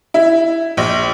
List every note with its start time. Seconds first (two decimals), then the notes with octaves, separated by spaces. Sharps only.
0.14 E4
0.77 A#1